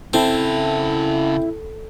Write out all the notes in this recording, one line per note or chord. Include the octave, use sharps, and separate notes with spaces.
C#3 C4 E4 A4 A5